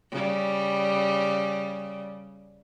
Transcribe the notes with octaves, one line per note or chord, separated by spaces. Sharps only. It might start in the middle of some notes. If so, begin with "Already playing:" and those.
C#3 G3